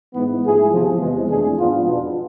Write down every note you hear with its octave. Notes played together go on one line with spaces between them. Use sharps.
G#2 E3 B3
G#2 F3 A3 E4 G#4
E2 C3 F3
E2 C3 E3 G#3
F2 E3 A3 D4 G#4
G#2 F3 B3 D4 F4
E2 B2 B3 D4